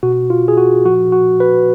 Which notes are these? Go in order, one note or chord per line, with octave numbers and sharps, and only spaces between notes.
B2 F#4
F4
G#4
F#4
A#2 F3 F#4
F#4
B4